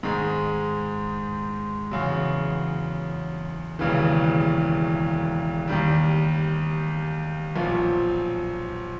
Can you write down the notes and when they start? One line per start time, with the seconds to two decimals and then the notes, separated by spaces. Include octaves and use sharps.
0.03 G#2 D#3 G#3
1.91 E2 C#3 F#3
3.79 E1 D#2 C#3 E3
5.68 D#2 D#3 G3
7.56 B1 A#2 F3